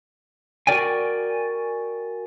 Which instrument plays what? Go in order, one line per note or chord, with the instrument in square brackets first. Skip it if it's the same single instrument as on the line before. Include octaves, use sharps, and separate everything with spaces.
[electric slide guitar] F#4 G4 A#4 D5 G5 G#5